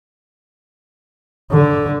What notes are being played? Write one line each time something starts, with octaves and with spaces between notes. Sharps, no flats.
D3